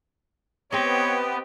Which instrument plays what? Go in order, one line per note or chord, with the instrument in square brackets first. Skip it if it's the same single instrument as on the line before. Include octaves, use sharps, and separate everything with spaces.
[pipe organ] B3 [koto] C4 D#5 [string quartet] G4 [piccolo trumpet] C#5